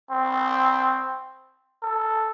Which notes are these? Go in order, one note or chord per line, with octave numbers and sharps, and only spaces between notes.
C4
A4